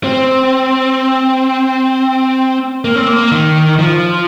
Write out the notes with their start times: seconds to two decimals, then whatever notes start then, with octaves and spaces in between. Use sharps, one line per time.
0.04 C4
2.85 A#3
2.96 C4
3.08 A#3
3.32 D#3
3.79 F3